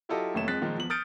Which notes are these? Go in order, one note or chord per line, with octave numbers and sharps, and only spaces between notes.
F#3 E4 F4 G4 A4 D#5
F1 D#2 A3 C#5 E7
F2 G#3 F#6 A6 B6
A#2 D#3 F3 G#3
E2 F3 F#7
D#6 F6 G6 A6 C#7 D7